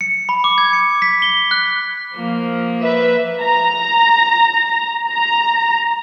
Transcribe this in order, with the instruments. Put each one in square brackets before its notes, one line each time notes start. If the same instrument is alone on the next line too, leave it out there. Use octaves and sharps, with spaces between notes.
[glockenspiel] C#7
B5
D6
G#6
C#7
B6
G7
F#6
[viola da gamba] F3 A#3
[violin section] B4 E5
[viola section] A#5
A#5